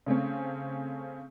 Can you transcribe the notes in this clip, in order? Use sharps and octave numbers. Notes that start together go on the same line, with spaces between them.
C#3 A3 C4 C#4